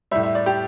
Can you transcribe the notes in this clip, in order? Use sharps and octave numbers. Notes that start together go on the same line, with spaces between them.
A2 G3 E5
E5
D5
G4